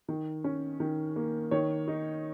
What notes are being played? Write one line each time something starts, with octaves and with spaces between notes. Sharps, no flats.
D#3
C#4
D#3
A#3
D#3 C#5
D#4